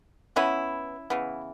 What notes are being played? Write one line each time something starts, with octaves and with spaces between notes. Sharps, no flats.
E3 B3 C#4 E4
C#3 E3 B3